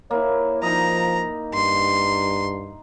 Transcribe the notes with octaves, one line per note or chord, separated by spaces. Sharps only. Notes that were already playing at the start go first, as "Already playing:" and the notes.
A#3 E4 C#5
F3 D#4 D#5 A#5
G2 C6